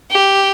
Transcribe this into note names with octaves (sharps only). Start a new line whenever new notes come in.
G4